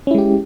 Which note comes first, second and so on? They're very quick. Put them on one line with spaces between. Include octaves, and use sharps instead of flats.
C#4 E4 G#3 G4